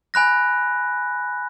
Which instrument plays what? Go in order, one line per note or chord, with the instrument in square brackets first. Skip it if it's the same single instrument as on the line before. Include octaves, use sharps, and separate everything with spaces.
[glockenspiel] G#5 B5 F#6 A#6